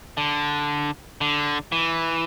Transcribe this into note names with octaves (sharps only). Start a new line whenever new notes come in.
D3
D3
E3